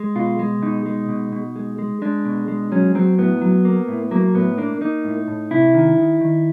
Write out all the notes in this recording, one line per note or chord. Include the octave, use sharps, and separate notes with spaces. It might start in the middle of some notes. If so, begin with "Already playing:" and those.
Already playing: G#3
B2 F4
G#3
B2 D#4
G#3
B2
B2
G#3
G#3
G#3 D4
B2
G#3
F#3 C#4
F#3 C4
A2 B3
F#3
A#3
A2
F#3 A#3
A2 B3
A#3 D4
A#3 D#4
A2
A2
C3 E4
D#3
D#3
D#3